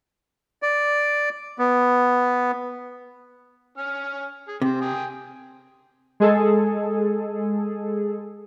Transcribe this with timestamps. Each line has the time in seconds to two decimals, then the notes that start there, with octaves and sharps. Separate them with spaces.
0.63 D5
1.59 B3
3.77 C#4 F6
4.48 G#4
4.62 C3 C4
4.81 G5 G#5 D#6
6.20 G#3 G#4 A4